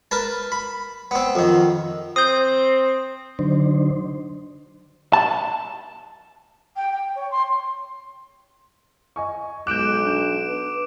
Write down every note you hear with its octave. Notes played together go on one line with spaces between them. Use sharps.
A#4 B4 A5
B5
B3 C4
F2 D#3
C4 D#6 G6
D3 F#3 D4 D#4 C5
A5
G5
G5
C#5
C6
D#5 G#5 C#6
B1 G#3 D6 F#6 G6 D7 E7
D4
B4